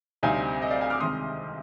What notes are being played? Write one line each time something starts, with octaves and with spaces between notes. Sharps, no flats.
D2 C3 G3 C4 D#4 F5 G#5
D#5
D5 F5
F5 G#5
D6 F6
C2 C3 D#3 G#3 C6 D#6